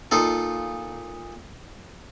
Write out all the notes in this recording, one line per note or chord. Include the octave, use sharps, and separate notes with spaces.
A#2 D#4 F4 A4